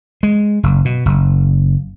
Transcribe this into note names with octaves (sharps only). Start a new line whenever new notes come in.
G#3
F#1
B2
F#1